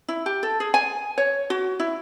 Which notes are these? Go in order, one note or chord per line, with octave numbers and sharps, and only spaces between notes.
E4
G4
A4
G#4
G#5
C#5
F#4
E4